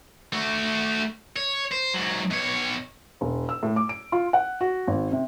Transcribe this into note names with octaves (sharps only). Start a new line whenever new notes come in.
A3 F#4
C#5
C5
G#2 F#3
B2 C#5
E1
E6
A2
D6
D7
F4
F#5
F#4
G#1
C3